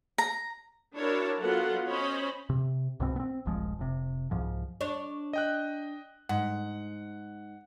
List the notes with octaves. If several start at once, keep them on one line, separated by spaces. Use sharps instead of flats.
A#5
D4 E4 F#4 A#4 C#5 A5
F#3 B3 F4 A4 F#5
C#4 C5 C#5 D#5 B5
C3
C2 G#2 B2 C4
B3 C4
D#1 A#1 F3 G#3
F1 C3
C2 G#2 F3
D4 C#5
D#5 G5 F#6
G#2 F#5